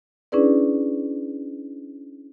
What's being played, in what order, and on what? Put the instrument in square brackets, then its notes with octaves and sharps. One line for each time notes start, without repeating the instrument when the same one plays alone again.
[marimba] C#4 D4 E4 G#4 B4 D5